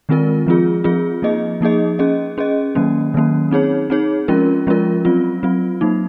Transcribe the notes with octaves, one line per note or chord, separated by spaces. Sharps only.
D#3 G#3 C4 F4 A#4
F3 C4 F4 G#4
F3 C4 F4 G#4
F3 A#3 D#4 G#4 D#5
F3 A#3 D#4 G#4 D#5
C#4 G#4 D#5
C#4 G#4 D#5
D#3 F#3 A#3 C#4
D#3 F#3 A#3 C#4
C4 D#4 G#4 C#5
C4 D#4 G#4 C#5
F3 G#3 C#4 F4 A#4
F3 G#3 C#4 F4 A#4
F#3 C4 F4
F#3 C4 F4
F#3 A#3 D#4